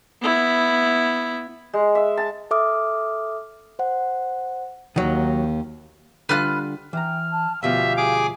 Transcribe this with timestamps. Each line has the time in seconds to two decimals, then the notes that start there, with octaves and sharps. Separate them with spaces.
0.22 B3 E4
1.74 G#3
1.95 E5
2.17 A5
2.51 A4 E5 D6 D#6 F6
3.79 C5 F#5
4.96 D#2 D#3 F#3
6.29 D3 G3 F4 B4 F6 F#6
6.93 E3 G5 A#5 F6
7.32 A5
7.63 D2 B2 F3 G4 E5 F5
7.97 G#4 D6